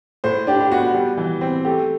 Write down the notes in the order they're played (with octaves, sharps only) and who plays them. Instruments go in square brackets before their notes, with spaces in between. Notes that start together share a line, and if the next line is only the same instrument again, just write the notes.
[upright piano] A2 C5
D4 G4
G4
B3 F#4
G3
E3
C4
A3 G4